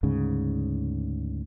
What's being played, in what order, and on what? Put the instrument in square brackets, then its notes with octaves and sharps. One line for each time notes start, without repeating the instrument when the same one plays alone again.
[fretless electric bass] D2 G#2 C#3